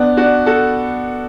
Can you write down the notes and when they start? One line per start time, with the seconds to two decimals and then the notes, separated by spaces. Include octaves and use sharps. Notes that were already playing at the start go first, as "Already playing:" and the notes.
Already playing: B3 D4
0.17 D4 F#4
0.46 F#4 A4